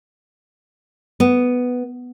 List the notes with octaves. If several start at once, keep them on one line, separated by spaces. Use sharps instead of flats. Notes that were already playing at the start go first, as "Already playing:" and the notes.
B3